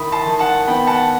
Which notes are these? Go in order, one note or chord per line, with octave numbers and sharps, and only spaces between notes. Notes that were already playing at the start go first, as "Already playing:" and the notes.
Already playing: D#3 E4 B5 D#6
A5 C6
D#3
F#5 A5
B3 G5 B5
F#5 A5